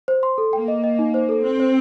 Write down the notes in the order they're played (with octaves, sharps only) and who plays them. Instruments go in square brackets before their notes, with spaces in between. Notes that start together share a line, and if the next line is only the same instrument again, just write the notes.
[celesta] C5
C6
A4
[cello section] A#3 [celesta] G5
[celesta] D#5
D#5
D#4
C5
A4
[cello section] C4 [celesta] C5
[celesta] C5